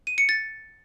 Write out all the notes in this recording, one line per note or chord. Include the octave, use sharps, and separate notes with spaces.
D#7
C#7
A6